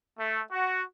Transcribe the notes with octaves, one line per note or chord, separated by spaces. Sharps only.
A3
F#4